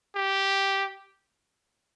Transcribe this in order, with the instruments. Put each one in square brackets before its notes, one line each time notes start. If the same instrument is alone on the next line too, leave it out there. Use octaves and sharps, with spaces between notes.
[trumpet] G4